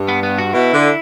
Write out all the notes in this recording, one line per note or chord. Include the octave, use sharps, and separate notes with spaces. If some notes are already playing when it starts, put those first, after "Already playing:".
Already playing: G2
B3
B3
F#4
B2 E4
D3